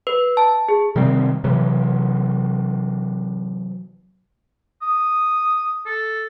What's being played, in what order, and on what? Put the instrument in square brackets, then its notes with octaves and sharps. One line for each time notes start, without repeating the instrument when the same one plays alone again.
[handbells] B4
A5
G#4
[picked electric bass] C3 D#3 G3 C4
C3 E3 F#3
[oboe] D#6
A4